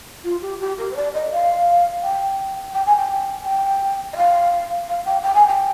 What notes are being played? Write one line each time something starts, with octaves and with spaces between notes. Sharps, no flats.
F4
G4
G4
A#4
C5
D5
D#5
F5
G5
G5
G#5
G5
G5
D#5
F5
F5
G5
G5
G#5
G5